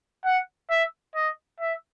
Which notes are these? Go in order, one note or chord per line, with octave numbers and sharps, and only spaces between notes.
F#5
E5
D#5
E5